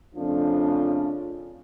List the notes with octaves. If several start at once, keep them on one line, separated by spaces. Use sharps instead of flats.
F2 C#3 F3 A3 D4